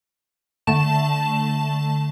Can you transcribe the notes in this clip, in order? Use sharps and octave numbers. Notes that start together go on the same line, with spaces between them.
D3 A3 A5 E7